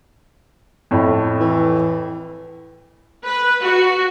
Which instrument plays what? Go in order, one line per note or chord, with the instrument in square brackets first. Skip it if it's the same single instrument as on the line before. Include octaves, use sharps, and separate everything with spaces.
[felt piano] F2 A2
[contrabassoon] E3
[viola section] B4
F#4